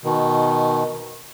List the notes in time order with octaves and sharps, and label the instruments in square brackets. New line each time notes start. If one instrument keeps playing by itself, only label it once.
[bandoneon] B2 D#3